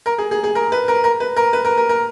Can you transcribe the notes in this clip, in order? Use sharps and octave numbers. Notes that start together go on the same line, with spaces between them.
A#4
G#4
G#4
G#4
A#4
B4
A#4
A#4
B4
A#4
B4
A#4
A#4
A#4